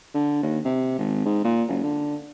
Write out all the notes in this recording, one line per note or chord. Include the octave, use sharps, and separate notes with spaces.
D3
D#2
C3
G#1
G#2
A#2
F#1
D3